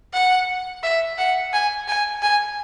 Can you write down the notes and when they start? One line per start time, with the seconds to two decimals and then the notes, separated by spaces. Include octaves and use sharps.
0.13 F#5
0.83 E5
1.18 F#5
1.53 G#5
1.88 G#5
2.22 G#5